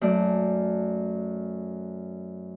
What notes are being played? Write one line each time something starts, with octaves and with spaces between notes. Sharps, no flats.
F#2 A3 D5